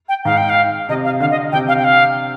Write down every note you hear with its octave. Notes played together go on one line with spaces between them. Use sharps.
G5
G#2 F5
G5
F5
C3 D#5
F5
D3 F5
D#5
C3 G5
F5
G5
F5